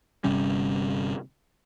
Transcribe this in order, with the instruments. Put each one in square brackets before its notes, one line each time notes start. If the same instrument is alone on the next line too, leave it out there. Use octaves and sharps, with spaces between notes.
[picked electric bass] G1 C3 G3 C#4